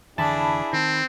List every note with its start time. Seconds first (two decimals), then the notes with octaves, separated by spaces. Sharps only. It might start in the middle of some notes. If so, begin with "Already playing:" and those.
0.18 F1 D3 E3 D4 E4 G#4 A5 B5
0.73 D#3 C4